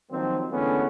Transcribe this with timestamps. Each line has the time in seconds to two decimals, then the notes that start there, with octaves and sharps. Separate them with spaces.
0.11 D#3 F3 F#3 A#3 C4
0.52 D3 E3 G#3 A3 B3 C#4